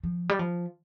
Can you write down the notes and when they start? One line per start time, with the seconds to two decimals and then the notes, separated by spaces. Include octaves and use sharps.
0.03 F3
0.29 G3
0.39 F3